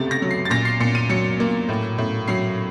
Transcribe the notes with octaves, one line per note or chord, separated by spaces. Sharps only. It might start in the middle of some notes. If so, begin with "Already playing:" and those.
Already playing: C#2 C3 A3 A6
A#6
F#3
C7
A6
A#2 A#6
C7
A#2 C#7
D#7
F#3 C#7
A#3
A2
A2
F#3 C7